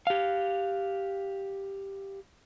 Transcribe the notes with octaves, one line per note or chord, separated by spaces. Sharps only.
G4 F5